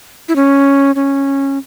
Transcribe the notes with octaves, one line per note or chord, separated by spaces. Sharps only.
E4
C#4
C#4